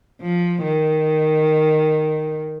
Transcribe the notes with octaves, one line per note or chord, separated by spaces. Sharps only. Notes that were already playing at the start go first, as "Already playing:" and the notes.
F3
D#3